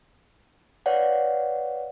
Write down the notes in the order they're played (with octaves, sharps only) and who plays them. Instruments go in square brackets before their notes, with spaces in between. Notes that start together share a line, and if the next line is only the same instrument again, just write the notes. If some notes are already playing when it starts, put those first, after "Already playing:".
[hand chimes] B4 C#5 D5 F5 F#5